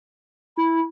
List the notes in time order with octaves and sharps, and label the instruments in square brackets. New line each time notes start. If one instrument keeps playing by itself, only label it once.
[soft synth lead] E4 [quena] B5